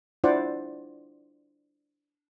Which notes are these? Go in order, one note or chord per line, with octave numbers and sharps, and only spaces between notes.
D4 E4 F4 C5 D5 F#5